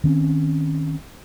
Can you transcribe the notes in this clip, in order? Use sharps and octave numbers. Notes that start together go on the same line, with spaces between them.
D#3 C4 C#4